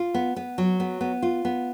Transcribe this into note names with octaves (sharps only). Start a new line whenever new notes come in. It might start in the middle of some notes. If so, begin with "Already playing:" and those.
Already playing: F4
B3
B3
F#3
B3
B3
F4
B3